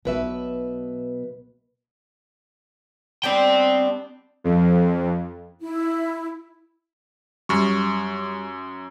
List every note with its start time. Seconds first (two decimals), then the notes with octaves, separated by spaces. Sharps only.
0.05 B1 B2 B4 E5
3.23 G3 B3 C4 D4 G5
4.44 F2
5.62 E4
7.49 F#2 G3 C#6